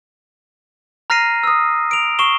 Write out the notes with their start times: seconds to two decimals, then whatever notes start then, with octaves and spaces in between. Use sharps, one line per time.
1.10 A#5 F6 A#6 C7 D#7
1.43 D#6 E6
1.91 D7 F7
2.19 C#6 C7 E7 G7